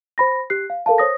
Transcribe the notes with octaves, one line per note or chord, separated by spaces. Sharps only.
C5 B5 A#6
G4 F#6 C7
F5
A4 A#4 F5 A5
C5 C#5 D#6 A#6